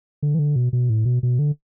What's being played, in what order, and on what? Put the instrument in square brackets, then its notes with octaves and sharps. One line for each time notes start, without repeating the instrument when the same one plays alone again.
[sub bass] D3
E3
D3
B2
B2
A2
B2
B2
D3